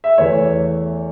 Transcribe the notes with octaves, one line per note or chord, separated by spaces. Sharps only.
E5
E2 E3 A3 C#5